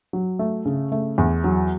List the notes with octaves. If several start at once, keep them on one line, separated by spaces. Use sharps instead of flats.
F#3
A3
C#3
A3
E2
F#3